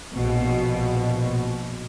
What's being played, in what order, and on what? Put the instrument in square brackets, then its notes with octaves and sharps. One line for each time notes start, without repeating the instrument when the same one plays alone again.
[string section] A#1 B2